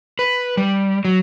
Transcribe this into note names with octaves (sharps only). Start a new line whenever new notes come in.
B4
G3
F#3